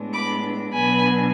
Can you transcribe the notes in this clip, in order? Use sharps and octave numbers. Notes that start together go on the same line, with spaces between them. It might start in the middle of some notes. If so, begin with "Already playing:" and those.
Already playing: A2 G#3 B3 D4
B5 D6
B2 F#3 B3 D4 G#5 B5